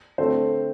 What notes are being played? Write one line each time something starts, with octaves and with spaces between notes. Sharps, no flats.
D3 A3 C4 A4 C5